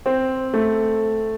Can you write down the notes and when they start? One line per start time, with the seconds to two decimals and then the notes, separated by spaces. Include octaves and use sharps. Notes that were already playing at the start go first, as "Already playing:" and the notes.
0.06 C4
0.54 A3